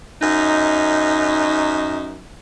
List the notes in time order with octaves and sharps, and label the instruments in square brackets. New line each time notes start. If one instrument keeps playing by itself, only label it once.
[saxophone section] F#2 D#4